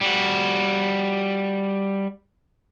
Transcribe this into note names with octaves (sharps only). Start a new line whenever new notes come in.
G3 F#4